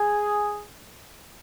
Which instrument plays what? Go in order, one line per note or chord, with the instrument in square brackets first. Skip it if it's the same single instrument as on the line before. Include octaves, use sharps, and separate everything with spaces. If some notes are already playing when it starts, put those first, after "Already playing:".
Already playing: [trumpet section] G#4